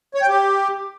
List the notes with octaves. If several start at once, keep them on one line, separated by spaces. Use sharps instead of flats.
C#5
G5
G4